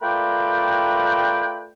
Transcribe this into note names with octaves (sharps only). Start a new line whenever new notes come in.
A3 F4 A#4 B4 D5 G5